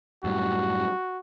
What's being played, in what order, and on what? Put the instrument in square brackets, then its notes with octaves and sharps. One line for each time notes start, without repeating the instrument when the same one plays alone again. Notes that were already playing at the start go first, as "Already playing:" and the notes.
[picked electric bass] F#2 A2 G3 [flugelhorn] F#4